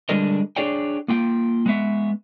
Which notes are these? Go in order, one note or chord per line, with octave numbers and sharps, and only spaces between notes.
D3 G3 G#3 D4 A#4 D#5
D4 G#4 C#5 D5 G5
A#3 F4 G5
G#3 B3 E5